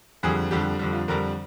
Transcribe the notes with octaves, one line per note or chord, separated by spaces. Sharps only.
F2 D3 G3 G#4
F2 D3 G3 G4
F2 D3 G3
F4
F2 D3 G3 A#4